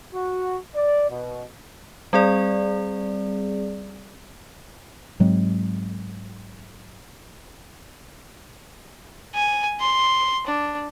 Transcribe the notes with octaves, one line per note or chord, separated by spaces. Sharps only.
F#4
D5
B2
G3 C4 G#4 D5
G#2 F#3 G#3 C4
G#5
C6
D4